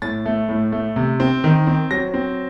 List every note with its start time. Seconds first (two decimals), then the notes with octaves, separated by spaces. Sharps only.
0.02 A2 A6
0.26 A3
0.49 A2
0.72 A3
0.96 C3
1.20 C4
1.44 D#3
1.67 C4
1.91 F#3 A#6
2.14 C4